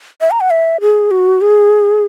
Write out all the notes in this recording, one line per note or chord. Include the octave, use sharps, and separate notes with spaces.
E5
A#5
F#5
E5
G#4
F#4
G#4